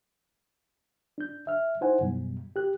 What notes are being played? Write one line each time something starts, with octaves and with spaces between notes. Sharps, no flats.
D4 G6
E5 F6
D#4 E4 C5 F#5 G#5
F#2 B2 G3
G4 F#6